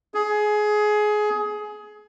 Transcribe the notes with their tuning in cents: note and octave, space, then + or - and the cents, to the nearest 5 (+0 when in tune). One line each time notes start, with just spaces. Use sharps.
G#4 +20